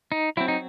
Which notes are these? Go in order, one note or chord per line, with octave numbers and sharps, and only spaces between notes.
D#4
F#3 C4 E4
D#4